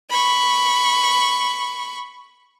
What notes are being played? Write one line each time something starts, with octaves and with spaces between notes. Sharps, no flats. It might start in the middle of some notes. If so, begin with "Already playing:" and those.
B5 C#6